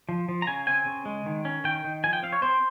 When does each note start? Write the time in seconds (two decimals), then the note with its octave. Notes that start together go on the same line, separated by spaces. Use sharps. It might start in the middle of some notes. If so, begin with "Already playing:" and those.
0.09 F3
0.29 F3
0.42 A#5
0.47 C#3 G#5
0.67 C4 G#5
0.86 C#3
1.06 G#3
1.26 D#3
1.45 C#4
1.64 D#3 G5
1.84 D#3
2.04 F3 G#5
2.13 G5
2.23 C4 F5
2.33 C#5
2.42 C4 C5